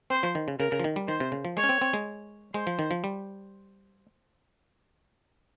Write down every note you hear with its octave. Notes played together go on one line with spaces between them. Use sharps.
C4 C5
F3
D#3
C#3
C#3 A#4
C#3
F3
D#3
G3
D#3 C5
C3
C#3
F3
G#3 C#5
C#4
C4
C4
G#3
G#3 C5
F3
D#3
F3
G3